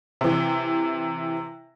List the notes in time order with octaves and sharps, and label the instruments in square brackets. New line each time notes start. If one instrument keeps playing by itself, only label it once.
[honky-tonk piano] C3 E3